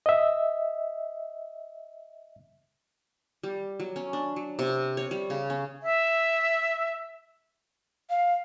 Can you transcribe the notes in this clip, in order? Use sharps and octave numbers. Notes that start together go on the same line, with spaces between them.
D#5 E5
G3
F#3
C#4
D4
F#3
C3
C#5
G3
C#3
C#4
E5
F5